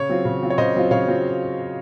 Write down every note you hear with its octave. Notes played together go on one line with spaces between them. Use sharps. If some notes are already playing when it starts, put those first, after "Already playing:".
Already playing: C#3 C#5
F#3 C4 F4
C#3
F#3 C4 F4
C#5
C#3 C5 D#5
F#3 C4 F4
C#3 C#5 F5
F#3 C4 F4